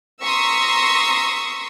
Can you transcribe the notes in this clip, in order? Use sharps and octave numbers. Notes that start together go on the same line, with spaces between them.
A#5 C6 C#6 D#6 E6 B6